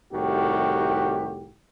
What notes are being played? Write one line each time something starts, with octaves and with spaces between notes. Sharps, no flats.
C2 A2 D#3 F#4 G4